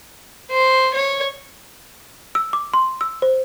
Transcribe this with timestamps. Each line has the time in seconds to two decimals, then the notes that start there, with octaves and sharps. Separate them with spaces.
0.50 C5
0.94 C#5
2.35 E6
2.53 D6
2.74 C6
3.01 E6
3.22 C5